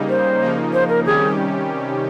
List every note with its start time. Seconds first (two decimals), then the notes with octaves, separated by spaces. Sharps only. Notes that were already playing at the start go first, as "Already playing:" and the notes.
Already playing: C#3 G3 A#3 D#4
0.09 C5
0.42 C#3 F3 A#3 D#4
0.73 C5
0.89 A#4
1.04 C3 D#3 G3 C#4 G4 G#4